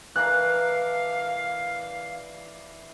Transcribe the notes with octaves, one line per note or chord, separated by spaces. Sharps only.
E3 D4 A#4 F5 F#6